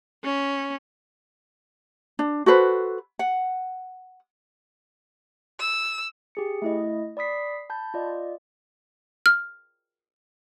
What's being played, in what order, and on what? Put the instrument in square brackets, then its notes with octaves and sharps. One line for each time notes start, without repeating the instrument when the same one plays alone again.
[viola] C#4
[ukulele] D4
F#4 A4 B4 C5
F#5
[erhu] E6
[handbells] G4 G#4 C#7
A3 E4 D#5
D5 B5 D#6 B6 C7
A5 B5 G6
F4 D5 D#5
[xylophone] F6